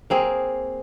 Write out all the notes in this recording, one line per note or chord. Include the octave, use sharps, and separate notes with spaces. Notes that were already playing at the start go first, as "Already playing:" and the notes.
A#3 C4 G#4